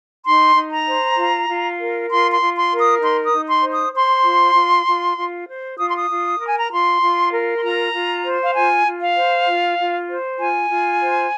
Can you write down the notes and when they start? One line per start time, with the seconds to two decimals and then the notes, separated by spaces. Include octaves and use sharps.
0.25 D#4 C6
0.55 D#4
0.71 A#5
0.87 C5
1.17 F4
1.48 F4
1.79 A#4
2.09 F4 C6
2.33 C6
2.40 F4
2.56 C6
2.71 A#4
2.79 D#6
3.02 D#4 C6
3.25 D#6
3.32 D#4
3.48 C6
3.63 C5
3.71 D#6
3.95 C5 C6
4.24 F4
4.55 F4
4.86 F4
5.17 F4
5.47 C5
5.78 F4 D#6
5.88 C6
5.97 D#6
6.10 F4
6.40 A#4
6.46 G#5
6.59 A#5
6.71 F4 C6
7.01 F4
7.32 A#4
7.56 C6
7.62 F4 A#5
7.93 F4
8.24 C5
8.43 F5
8.55 F4 G#5
8.86 F4
9.01 F5
9.16 C5
9.47 F4
9.78 F4
10.09 C5
10.39 F4 G#5
10.69 F4
11.01 C5